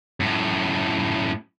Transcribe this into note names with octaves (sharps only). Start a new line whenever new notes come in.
F#2 A2